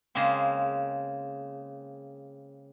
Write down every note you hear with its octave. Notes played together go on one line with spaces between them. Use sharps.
C#3 G#3 A#3 C4